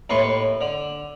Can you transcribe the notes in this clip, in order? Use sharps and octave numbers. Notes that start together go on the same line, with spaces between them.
D#2 A2 B4 C6 C#6
D3